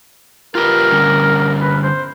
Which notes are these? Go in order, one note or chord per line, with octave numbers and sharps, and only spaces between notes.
F4 G4 A#4 B4
D3 G3 C#4
B4
C5